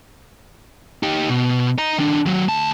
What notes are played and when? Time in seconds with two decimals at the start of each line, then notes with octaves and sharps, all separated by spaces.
1.03 D#4 G4
1.29 B2
1.78 D#5 A#5
1.98 D#3 D4
2.26 D#3 F#3
2.48 D2 A5